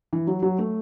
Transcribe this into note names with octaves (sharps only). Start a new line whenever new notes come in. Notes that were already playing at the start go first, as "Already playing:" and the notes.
E3
F#3
F#3
A3